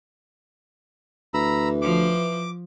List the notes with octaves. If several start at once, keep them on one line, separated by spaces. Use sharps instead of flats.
D2 E3 A#5 B5 E6
F3 D6